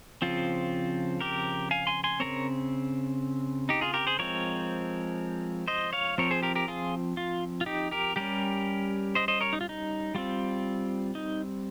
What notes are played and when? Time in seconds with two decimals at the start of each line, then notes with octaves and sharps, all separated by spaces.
0.22 C#3 F3 C4 F4
1.21 G4 A#4
1.71 F5 G#5
1.87 G#5 C6
2.04 G#5 C6
2.20 G3 C4 A#4 C#5
2.24 C#3
3.69 D#4 G4
3.81 F4 G#4
3.94 G4 A#4
4.07 G#4 C5
4.19 F3 G#3 C4 A#4 C#5
5.68 C5 D#5
5.93 C#5 F5
6.18 F3 C4 A#4 C#5
6.31 G#4 C5
6.42 G4 A#4
6.55 G4 A#4
6.68 F4 G#4
7.17 F4
7.61 F4
7.66 D#4 G4
7.91 G4 A#4
8.16 G3 C#4 G4 A#4
9.15 C5 D#5
9.28 C5 D#5
9.41 A#4 C#5
9.53 D#4
9.61 F4
9.69 D#4
10.15 G3 C4 F4
11.15 D#4